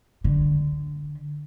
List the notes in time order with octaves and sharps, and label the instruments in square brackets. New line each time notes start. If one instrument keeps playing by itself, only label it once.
[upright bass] D3